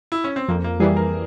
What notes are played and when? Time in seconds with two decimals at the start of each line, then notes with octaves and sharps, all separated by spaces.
0.12 E4
0.24 C#4
0.36 C4
0.48 F2 A#3
0.64 A#3
0.80 E3 G3 G#4
0.97 A#4